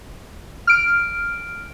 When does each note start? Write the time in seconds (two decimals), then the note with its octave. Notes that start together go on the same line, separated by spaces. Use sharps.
0.67 F6 D7